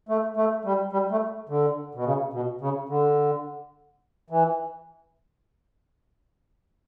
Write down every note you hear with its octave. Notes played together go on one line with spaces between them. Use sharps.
A3
A3
G3
G3
A3
D3
B2
C#3
B2
C#3
D3
E3